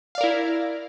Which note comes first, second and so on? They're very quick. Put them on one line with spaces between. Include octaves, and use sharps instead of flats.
F5 D5 A#4 E4